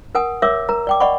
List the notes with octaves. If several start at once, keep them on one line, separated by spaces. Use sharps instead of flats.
A#4 F#5 G#5 D#6
A#4 C#5 E5 D6 E6
A#4 A#5
D5 G5 D6
D5 D#5 F#5 B5 C#6